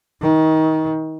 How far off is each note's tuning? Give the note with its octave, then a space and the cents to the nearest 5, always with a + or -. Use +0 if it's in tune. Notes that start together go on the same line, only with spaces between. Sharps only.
D#3 +25